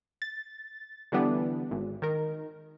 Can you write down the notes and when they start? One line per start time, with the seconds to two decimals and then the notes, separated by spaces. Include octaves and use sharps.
0.22 A6
1.12 D3 E3 G3 B3 D4
1.71 G#1
2.02 D#3 A#4